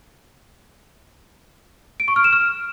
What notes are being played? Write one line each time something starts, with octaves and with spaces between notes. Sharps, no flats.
D7
C#6
F6
E7
F6